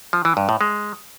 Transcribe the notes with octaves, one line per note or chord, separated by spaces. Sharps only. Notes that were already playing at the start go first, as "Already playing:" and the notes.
F3
E3
G2
A2
G#3